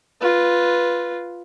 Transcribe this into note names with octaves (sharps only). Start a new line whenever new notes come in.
F4 B4